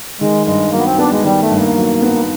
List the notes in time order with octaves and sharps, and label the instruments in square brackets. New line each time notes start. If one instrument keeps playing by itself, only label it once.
[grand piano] D#3 [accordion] G#3
[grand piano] G2 [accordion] G#3
[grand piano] F#3 [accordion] A#3
[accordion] B3
C4
[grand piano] B3 [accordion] D4
[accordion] G#3
[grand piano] D#3 [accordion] G3
[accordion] A3
[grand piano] G2
[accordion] A#3
[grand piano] F#3
B3